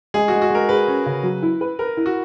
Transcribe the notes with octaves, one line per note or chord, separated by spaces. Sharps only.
G#3 G#4
G#3 F#4
F#4
G#3 A#4
G#4 B4
C#4
C#3
F#3
E4
B4
A#4 B4
E4
F#4